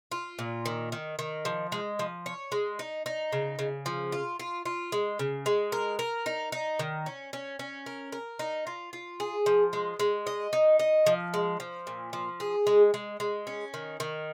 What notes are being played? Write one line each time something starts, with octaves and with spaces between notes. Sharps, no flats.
F4
A#2
D#3
D#3
D#3
F3
G#3
F3
C#5
G#3
D#4
D#4
C#3
C#3
F3
F4
F4
F4
G#3
C#3
G#3
A#4
A#4
D#4
D#4
D#3
C#4
C#4
C#4
A#4
A#4
D#4
F4
F4
G#4
F3
G#3
G#3
D#5
D#4
D#5
F3
G#3
F3
A#2
F3
G#4
G#3
G#3
G#3
C#4
D#3
D#3